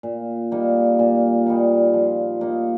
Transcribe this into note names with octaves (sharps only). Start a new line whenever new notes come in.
A#2
G3 A#3 D#4
A#2
G3 A#3 D#4
F3
A#3 D#4